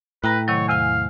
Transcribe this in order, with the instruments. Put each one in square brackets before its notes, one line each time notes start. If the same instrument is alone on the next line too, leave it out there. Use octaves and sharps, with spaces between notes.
[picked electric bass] A2 [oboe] B4 [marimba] G5 A#5 A#6
[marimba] C3 D#3 F#3 [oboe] C#5
[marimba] E2 C3 G#5 [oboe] F5